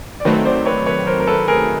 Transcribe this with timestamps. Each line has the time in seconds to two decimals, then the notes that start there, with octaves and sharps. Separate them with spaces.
0.20 D5
0.25 D#3 F#3 A3 C4 B4 C#5
0.45 C5 D5
0.66 B4 C#5
0.86 B4 C#5
1.07 A#4 C5
1.20 A#4
1.27 A4 B4
1.48 G#4 A#4